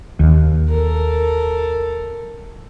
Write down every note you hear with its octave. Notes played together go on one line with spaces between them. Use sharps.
D#2
A4 A#4